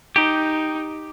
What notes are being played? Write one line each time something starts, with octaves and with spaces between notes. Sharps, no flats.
D#4 G4